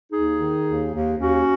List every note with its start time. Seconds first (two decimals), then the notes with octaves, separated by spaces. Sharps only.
0.11 D#2 D#4 G#4
0.38 D#3
0.64 D#2
0.91 D#2
1.17 D#2 C#4 F#4